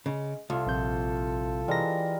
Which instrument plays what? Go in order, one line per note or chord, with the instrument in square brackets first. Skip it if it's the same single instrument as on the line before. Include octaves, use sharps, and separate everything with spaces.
[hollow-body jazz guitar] C#3 [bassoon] G#3
[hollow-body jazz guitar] C2 [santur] F4 F5 [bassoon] A4
[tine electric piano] A#1 C4 G6
[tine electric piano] E3 A#6 [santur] G3 G#3 A#4